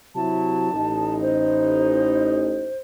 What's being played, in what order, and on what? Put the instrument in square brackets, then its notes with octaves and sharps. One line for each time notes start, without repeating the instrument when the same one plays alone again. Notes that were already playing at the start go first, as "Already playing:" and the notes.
[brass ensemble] C3 F#3 E4 [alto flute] A5
[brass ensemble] A1 D#4
[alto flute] C5